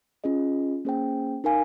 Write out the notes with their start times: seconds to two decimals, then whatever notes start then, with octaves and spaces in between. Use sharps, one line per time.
0.24 C#4 F4 G#4 D#5
0.85 A#3 C#4 G#4 C5 G5
1.44 D#4 A#4 F5 G#5